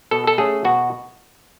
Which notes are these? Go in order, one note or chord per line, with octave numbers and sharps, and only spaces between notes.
B2 A4
A4
A3 C#4 G#4
B2 F#4